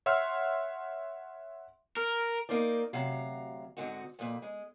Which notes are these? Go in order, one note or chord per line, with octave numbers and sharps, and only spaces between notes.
C#5 E5 F#5 C6 E6 F6
A#4
A#3 D#4 A#4 C5 D5
D2 C3 F#3 F5 A#5
G#2 D3 C4 D#4 F#4
F2 A#2
G#3